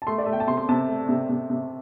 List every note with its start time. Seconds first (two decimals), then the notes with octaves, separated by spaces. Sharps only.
0.02 A5
0.07 A3 C6
0.18 D5
0.26 A3 E5
0.33 G5
0.40 A5
0.47 C3 C6
0.57 C6
0.69 C3 A5
0.88 A3
1.09 C3
1.29 C3
1.50 C3